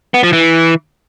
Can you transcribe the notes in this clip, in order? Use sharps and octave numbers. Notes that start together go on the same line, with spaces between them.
B3
F3
E3